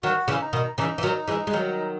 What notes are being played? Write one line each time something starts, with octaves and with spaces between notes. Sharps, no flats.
D#3 F#3 F#4
C#3 E3
D#4
B2 D#3
C#3 E3 D#4
E3
D#3 F#3
E3 G#3
G#3
D#3 F#3